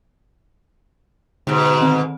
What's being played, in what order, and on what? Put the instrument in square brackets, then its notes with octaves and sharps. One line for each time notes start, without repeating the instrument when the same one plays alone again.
[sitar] G#2 B2 [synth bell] D3
[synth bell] D#3 C4